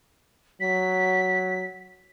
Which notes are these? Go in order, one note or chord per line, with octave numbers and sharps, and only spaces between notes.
F#3 B6